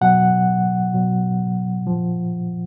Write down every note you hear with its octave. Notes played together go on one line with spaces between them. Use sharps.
B2 F#3 F#5
B2 F#3
A#2 F3